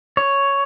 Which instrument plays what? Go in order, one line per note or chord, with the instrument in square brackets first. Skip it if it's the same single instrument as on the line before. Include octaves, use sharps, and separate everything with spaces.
[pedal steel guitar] C#5